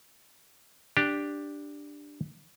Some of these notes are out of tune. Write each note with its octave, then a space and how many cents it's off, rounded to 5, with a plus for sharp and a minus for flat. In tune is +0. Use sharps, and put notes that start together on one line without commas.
D4 +0 G4 +0